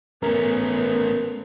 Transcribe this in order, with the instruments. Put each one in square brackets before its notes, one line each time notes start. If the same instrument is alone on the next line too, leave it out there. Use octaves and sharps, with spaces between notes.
[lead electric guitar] A3 C#4 [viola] B3 [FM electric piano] A#4